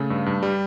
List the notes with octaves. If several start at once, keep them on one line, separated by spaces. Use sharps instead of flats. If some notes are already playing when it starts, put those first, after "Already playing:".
Already playing: C#3 A3 A4
G2
G2
G3